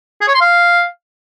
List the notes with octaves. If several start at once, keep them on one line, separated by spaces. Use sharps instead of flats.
G#4
C#5
C6
F5